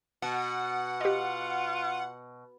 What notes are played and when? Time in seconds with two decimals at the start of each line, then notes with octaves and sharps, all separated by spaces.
0.22 B2 F#5
1.01 F4 G4 D#5